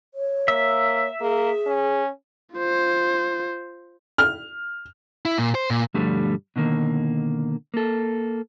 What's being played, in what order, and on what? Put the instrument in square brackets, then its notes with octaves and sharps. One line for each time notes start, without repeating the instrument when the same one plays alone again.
[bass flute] C#5
[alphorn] A#3 [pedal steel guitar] E5
[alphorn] A#3 [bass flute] G#4
[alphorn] C#4
[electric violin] F4 C5
[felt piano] F6
[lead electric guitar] E4
A#2
C5
A#2
[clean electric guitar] B1 G2 D3 F3 G3 A3
B2 D3 D#3 A#3
A#3 A4